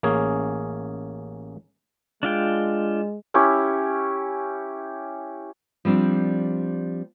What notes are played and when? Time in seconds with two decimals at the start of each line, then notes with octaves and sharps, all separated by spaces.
0.03 A1 A#3 C#4 G#4
2.23 G#3 D4 F4 G5
3.34 C#4 E4 G4 C#5
5.85 F3 G3 C4 D4